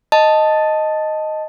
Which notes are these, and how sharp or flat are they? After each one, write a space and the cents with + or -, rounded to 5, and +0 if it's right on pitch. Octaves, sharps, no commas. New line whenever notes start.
D#5 +0 A5 +0